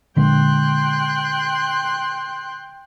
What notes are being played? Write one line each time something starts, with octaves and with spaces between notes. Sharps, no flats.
A#2 D3 G#3 G5 C6 F#6